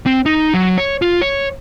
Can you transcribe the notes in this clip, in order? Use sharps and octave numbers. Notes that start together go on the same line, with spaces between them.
C4
D#4
F#3
C#5
F4
C#5